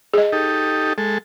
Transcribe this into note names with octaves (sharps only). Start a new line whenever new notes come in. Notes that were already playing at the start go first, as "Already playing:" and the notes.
G#4 D#5
D#4 G4 A4
G#3 A4